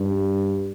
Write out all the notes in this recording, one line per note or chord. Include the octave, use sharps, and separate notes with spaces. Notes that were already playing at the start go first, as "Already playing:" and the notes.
Already playing: G2